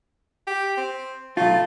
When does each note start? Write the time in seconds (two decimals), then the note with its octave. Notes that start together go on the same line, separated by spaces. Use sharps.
0.47 G4
0.77 C4
1.37 B1 A3 F4